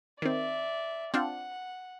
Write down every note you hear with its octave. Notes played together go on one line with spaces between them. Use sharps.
D#3 C4 D5 E5
C4 D4 F4 F#5